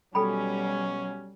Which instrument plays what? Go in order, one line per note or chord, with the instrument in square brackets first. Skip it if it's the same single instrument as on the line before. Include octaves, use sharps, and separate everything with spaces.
[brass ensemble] B2 F#3 C#4 [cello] G3 [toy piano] A4 G5 B5